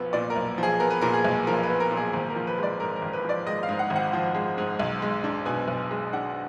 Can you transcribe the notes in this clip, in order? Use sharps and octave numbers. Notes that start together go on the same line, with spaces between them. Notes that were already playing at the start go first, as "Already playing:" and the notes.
Already playing: B1 F3 B3
A#2 D5
A#4
B1
F3 G#4
B3 A#4
B4
A#2 A#4
G#4
B1
F3 A#4
B4
B3
A#4
A#2
G#4
G#1 A#4
A#4
F3
B4
G#3 D5
G#2 A#4
A#4
G#1
B4
F3 D5
G#3 D#5
F5
G#2
F#5
G#1
F#5
F3
G#3
G#2
B1
G#3
D4
B2 G#5
B1
G#3
D4 F#5